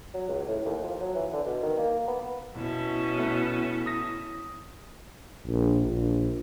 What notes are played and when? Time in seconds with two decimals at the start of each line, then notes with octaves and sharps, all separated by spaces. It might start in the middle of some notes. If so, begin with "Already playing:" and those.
0.14 F#3
0.29 C#2
0.48 A2
0.66 D#2
0.84 F3
1.01 F#3
1.16 E3
1.33 D3
1.47 B2
1.63 D#3
1.78 A#3
2.08 B3
2.55 B2 C#4 E4 E5 A5
3.18 A3 B3
3.86 D#6 A#6
5.47 A#1
5.86 A#1